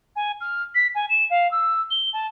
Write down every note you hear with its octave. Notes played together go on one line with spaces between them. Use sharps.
G#5
F6
B6
G#5
E7
F5
E6
G7
A5